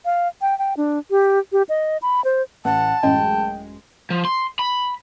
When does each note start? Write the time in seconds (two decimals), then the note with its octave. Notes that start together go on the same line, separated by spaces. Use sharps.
0.05 F5
0.41 G5
0.59 G5
0.77 D4
1.11 G4
1.52 G4
1.69 D#5
2.02 B5
2.24 C5
2.65 A1 E3 F#5 A5 C#7
3.03 A1 F#2 G#3 G5
4.10 F3
4.25 C6
4.59 B5